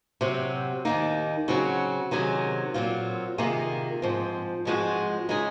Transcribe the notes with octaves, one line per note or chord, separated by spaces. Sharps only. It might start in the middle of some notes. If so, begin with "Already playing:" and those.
C3 F#3 C4 F#4
D#2 D#3 A#3 D#4
C#3 F#3 C4 F#4
C3 D#3 F#3 C#4 G#4
A#2 F#3 C4 F4
C3 D#3 A#3 F4 G#4
G#2 F3 C4
G#2 F3 G#3 C4 F#4
C#3 G#3 D#4 G#4